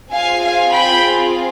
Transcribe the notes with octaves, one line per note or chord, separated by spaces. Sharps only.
C4 F4 G#4 F5 G#5
F5 G#5
G5 B5